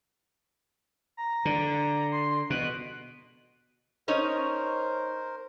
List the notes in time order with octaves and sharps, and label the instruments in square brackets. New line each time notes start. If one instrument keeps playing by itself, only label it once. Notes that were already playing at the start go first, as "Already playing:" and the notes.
[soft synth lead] A#5
[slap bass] D3
[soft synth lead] C6
[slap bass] B2 [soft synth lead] F#6
[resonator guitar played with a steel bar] C#4 D#4 C#5 [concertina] A#4 C5